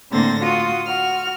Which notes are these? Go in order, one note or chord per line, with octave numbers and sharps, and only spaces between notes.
A2 D3 A#3 C4 A6 A#6
F4 F#4 D#6
F#4 F6